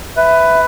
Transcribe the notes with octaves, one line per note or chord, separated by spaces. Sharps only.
B4 E5